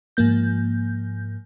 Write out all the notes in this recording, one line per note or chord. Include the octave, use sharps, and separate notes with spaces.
G#2 F3 A#3 G6